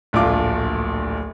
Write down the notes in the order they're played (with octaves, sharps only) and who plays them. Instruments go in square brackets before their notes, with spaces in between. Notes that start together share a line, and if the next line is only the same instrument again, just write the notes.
[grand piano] D1 A#1 A3 F4 D6